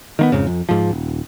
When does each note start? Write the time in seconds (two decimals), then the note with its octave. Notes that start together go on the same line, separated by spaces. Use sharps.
0.19 D#3 A#3 B3
0.32 F2 G#2 C#3
0.47 F2
0.69 G#2 F3
0.91 D#1